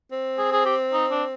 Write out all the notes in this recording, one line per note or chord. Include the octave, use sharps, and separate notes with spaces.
C4
G#4
G#4
G4
D#4
D4